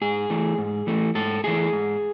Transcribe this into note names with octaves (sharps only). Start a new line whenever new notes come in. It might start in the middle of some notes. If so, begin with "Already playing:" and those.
G#2 G#4
E3 A3
G#2
E3 A3
G#2 A4
E3 A3 G#4
G#2